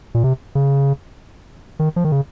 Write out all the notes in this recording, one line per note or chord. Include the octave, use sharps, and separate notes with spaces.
A#2
C3
C#3
D#3
F3
D#3
C#3